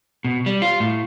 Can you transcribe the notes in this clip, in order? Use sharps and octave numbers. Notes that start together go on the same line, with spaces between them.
B2
G3
F4
A2